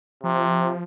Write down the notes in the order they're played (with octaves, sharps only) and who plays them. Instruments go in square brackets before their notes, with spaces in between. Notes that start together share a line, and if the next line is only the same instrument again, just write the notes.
[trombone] C3 [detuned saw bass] F3